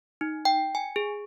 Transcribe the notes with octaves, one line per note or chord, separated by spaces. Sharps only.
D#4
G5
G#5
G#4